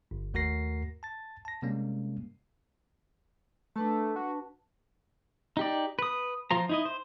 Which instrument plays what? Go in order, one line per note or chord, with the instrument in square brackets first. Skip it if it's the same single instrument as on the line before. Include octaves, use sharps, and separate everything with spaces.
[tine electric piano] G1
D#2 A3 F#4 A#4 A#6 C7
A5 A6
A5 A#6
C3 G3 G#3 A#3 C#4
[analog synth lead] A3 [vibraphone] D4 B4 A5
[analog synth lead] F#4
[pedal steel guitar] D#4 G4 D5
B4 D#6
F3 F4 C5 A#5
D#4 E4 D#5
C5